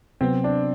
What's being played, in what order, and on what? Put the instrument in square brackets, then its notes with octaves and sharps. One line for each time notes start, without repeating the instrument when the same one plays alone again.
[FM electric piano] C3 F#3 B3 [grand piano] C4
[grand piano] D4